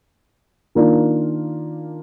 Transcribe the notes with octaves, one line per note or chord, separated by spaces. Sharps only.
D#3 A#3 D4 F4